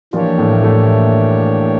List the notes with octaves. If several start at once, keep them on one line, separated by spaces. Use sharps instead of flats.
E3 F3 A#3 D4 F4 G4 C#5
A2 A3
A2 A3